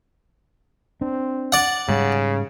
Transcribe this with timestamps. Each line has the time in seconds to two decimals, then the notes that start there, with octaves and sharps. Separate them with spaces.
1.01 C4 D4
1.52 D5 F#5
1.89 G#2 C#3 G3 C#4